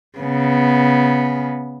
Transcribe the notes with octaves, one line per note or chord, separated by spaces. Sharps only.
C#3 B3